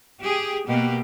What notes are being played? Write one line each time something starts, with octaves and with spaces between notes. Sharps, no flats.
G4 G#4
B2 A#3 G4